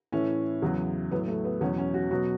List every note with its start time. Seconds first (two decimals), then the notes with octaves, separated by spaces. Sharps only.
0.12 A2 E3 C#4
0.62 E2 C#3 F#3
1.11 A2 F#3 B3
1.28 A3
1.44 B3
1.61 E2 B2 F#3 C#4
1.78 C#4
1.94 F#4
2.11 B2 F#3 F#4